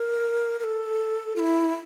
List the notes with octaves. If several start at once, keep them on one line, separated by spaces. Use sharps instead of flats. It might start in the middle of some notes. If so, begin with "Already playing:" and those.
Already playing: A#4
A#4
A4
F4
E4